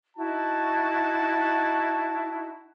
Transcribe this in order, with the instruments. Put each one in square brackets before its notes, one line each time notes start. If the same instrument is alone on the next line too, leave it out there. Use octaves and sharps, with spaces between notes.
[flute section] D#4 E4 F#4 [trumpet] A5